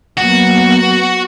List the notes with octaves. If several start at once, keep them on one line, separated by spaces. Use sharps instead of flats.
F#3 A#3 B3 F#4